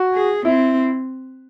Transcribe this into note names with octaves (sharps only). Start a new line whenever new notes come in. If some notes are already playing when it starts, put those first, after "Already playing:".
Already playing: F#4
G#4
C4 E4